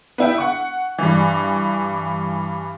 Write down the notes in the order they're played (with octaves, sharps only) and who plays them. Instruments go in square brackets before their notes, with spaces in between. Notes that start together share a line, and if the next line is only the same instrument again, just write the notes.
[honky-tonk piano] B3 E4 G5
F#5 C#6
G2 E3